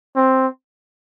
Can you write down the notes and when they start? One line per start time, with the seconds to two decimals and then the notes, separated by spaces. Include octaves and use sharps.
0.16 C4